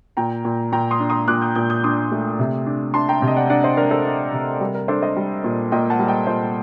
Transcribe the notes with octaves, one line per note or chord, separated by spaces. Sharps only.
A#2 G5 A#5
A#2
A#2 G5 A#5
C6 D#6
D4
C6 D#6
A#2 D6 F#6
D#6 G6
A#2 D#6 G6
D#6 G6
D4 C6 D#6
A3
C3
D4
D4 A5 C6
G5 A#5
C3
D#5
D5 F#5
D4 D5 F#5
C5 D#5
D4 A#4 D5
A4 C5
D4
C3
G3 A#4
A#4
D4 A4 C5
C5 D#5
G3
A#2
A#2 D#5 G5
F#5 A5
G3
D#5 G5
A#2 C5 D#5